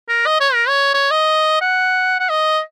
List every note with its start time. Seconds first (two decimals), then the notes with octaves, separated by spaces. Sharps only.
0.09 A#4
0.26 D#5
0.41 C#5
0.54 A#4
0.69 C#5
0.94 C#5
1.11 D#5
1.61 F#5
2.20 F#5
2.30 D#5